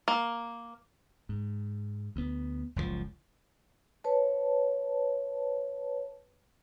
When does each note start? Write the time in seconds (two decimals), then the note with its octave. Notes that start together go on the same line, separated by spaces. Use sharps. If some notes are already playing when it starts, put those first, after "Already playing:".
0.08 A#3
1.29 G#2
2.16 D2 B3
2.76 F#1 C#2 A2 F3
4.04 B4 C#5 A5